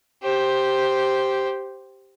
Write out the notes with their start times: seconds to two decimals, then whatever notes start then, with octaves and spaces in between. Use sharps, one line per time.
0.23 G4 C5